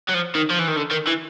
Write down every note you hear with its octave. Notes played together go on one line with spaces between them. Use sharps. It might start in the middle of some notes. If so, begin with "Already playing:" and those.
F#3
F3
D#3
F3
E3
D#3
D3
D#3
E3